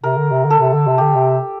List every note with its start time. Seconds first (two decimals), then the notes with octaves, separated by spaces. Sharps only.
0.03 C3 A#4
0.18 D3
0.31 C3
0.45 D3
0.50 A4
0.60 C3
0.74 D3
0.87 C3
0.98 D3 G4
1.15 C3